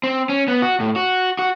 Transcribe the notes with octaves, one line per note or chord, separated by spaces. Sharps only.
C4
C#4
B3
F#4
A2
F#4
F#4